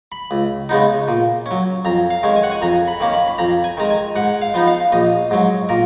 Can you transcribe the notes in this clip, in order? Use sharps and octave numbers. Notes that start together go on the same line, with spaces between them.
B5
C#2
C#3 G#3 B3 D#4
A#2
C#4
F#3
F2 A#5
F5
D#3 G#3 C#4
G#5
F#5
G#5
F2 A#5
B5
D#3 A#3 C#4
B5
B5
F2 A#5
G#5
D#3 G#3 A#5
G#5
G#2 F#5
F5
F3 B3 D#4
F5
A#1 D#5
G#2 F#3
A#2 A#4